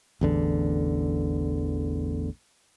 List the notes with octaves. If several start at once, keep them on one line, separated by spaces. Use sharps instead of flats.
A1 E2 D3